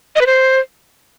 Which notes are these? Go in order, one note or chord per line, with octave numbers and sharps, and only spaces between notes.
D#5
B4
C5